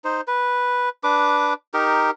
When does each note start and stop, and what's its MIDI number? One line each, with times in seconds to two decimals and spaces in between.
0.04 0.21 63
0.04 0.21 72
0.28 0.89 71
1.04 1.54 62
1.04 1.54 71
1.04 1.54 86
1.74 2.11 63
1.74 2.11 67
1.74 2.11 70